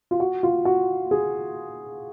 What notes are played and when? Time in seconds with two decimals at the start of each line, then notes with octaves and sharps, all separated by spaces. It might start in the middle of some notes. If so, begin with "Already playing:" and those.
0.11 F4
0.20 F#4
0.43 F4
0.65 F#4
1.11 G#4